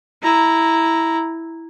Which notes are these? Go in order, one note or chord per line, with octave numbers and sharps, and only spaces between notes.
E4 A#5